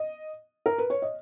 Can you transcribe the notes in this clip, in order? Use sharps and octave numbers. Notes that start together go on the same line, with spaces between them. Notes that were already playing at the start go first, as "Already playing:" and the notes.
Already playing: D#5
A#4
B4
C#5
D#5